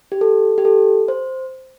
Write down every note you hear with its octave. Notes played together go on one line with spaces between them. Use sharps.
G4
A4
G4
A4
C5